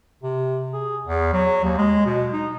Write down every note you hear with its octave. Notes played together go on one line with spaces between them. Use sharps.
C3
G#4
E2
F#3
D#2
G#3
B2
D#4